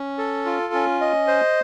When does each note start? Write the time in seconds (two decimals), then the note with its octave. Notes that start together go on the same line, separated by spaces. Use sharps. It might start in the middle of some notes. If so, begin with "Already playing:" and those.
Already playing: C#4
0.18 A4
0.45 F4
0.74 C#4
1.01 D#5
1.27 C5